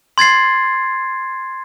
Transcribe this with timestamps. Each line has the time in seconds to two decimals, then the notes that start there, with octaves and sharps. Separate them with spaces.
0.18 C6 G#6 A6 C7